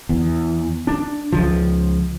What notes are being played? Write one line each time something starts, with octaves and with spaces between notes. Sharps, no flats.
E2
D4
C#2 F3